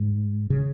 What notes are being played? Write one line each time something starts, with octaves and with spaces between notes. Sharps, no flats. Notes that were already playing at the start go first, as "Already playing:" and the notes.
Already playing: G#2
C#3